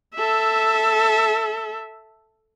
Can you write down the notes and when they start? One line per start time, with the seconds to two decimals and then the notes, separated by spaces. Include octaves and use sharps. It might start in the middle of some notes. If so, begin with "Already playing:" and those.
0.15 A4 E5